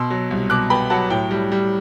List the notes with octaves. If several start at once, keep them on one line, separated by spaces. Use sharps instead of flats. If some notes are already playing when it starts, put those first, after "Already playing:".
Already playing: B2 C6 E6
F#3
C2
B2 D6 F#6
B3 G5 B5
F#3 F#5 A5
A2 G5
G3
G3